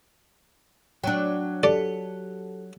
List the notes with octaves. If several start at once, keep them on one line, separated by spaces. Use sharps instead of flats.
F#3 D4 G5
G4 A4 D5 A5